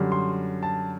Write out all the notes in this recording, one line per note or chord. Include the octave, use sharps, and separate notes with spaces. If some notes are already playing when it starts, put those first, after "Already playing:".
Already playing: F#2 D3 G3
C6
A5